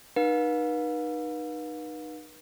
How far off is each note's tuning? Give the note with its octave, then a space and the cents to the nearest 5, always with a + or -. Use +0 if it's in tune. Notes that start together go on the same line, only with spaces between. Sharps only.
D#4 -25 B4 -35 F5 +40